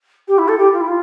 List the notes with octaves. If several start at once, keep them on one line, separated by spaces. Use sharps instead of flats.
G4
E4
A4
G4
F4
E4
F4